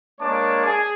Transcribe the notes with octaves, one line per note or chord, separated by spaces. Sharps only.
G#3 A#3 D4 C#5 A5 D6
G#4